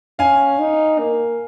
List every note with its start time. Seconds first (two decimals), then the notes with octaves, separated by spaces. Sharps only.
0.19 C#4 F5 G#5
0.59 D#4
0.99 A#3